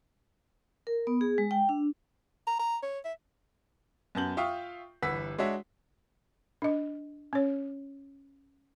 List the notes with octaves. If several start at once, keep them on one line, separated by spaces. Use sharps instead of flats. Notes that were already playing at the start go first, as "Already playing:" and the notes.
A#4
B3
G#4
G#3
G5
D4
A#5
A#5
C#5
E5
F#2 B3 A5 G6 F#7
F4 E5 F5 G5 C#6 D#6
G1 E3 B4 F#5 E6 B6
G#3 D4 F#4 C#5 E5
D4 D#5
C#4 C#5